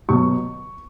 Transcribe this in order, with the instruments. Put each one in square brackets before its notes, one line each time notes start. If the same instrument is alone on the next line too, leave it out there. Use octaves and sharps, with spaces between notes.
[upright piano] B2 F#3 C#6